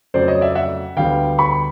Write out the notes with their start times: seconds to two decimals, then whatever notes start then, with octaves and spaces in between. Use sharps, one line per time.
0.14 F2 C#3 F#3 A3 C5 D5
0.28 C#5 D#5
0.41 D5 E5
0.55 E5 F#5
0.97 D2 D3 G3 B3 F5 G5
1.38 B5 C#6